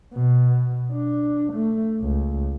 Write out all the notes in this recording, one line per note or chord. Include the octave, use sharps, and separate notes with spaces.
B2
D4
A3
C#2